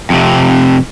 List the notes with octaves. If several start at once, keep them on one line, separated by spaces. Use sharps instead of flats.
F2 C3